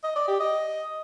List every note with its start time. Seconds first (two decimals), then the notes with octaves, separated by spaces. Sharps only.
0.04 D#5
0.16 D5
0.28 G4
0.40 D#5